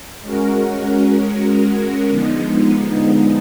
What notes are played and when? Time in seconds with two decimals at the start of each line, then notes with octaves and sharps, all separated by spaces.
0.22 G#3 C#4 F#4 A#4
2.08 D3 F3 G#3 B3 D#4